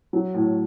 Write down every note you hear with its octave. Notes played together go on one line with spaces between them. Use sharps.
F#3
A2